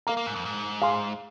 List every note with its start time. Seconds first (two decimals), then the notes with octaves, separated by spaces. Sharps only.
0.07 A#3 A#4 F5 A#5
0.17 A#3
0.26 G#2
0.36 F2
0.45 G#2
0.82 G#4 F5 G#5 C6